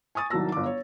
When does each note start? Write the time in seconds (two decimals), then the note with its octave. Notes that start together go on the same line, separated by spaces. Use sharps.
0.15 G#5 C#6 D#6 A6
0.30 C2 D#3 F#3 A5 E6 A#6
0.52 G1 D6
0.66 C#5